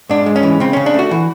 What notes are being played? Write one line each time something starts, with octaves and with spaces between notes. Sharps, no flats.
G#2 D4
G#3
C#4
E3
C#3 C4
C#3 C#4
D4
A3 F#4
E3